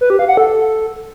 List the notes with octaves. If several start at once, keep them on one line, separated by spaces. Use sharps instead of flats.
B4
G4
F5
F#5
A4